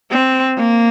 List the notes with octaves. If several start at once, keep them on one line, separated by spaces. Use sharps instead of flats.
C4
A#3